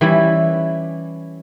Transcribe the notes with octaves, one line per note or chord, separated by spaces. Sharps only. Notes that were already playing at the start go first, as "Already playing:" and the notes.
E3 G3 C#4 E4